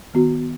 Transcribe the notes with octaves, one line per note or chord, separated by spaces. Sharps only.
D#3 B3 F#4